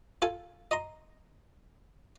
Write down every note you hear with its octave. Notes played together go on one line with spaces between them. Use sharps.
F4 A4 G#5
D#5 A#5 C6